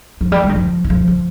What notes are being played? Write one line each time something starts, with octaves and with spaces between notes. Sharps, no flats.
F3
G3
G3
D#3
F3
D#3
F3
F3